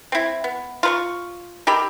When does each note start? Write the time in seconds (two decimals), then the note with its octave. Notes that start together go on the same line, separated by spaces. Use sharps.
0.12 C4 E4
0.44 B3
0.83 F4 B4 C#6
1.67 D#3 G4 A4 B5